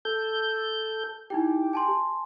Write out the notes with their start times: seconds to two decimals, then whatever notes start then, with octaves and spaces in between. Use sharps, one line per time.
0.05 A4 G6
1.30 D#4 E4 G4 G5
1.73 G#5 A5 C6